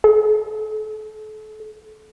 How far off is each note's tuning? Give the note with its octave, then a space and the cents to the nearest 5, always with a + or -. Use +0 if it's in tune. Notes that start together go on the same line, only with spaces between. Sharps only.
A4 -35